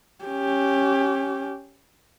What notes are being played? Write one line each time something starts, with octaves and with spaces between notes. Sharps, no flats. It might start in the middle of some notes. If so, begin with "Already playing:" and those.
C#4 G4